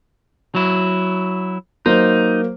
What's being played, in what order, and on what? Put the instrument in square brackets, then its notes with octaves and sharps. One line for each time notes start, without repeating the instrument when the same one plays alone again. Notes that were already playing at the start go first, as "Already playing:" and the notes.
[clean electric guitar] F#3 E4
[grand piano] F#3 A#3 C5 [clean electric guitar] D#4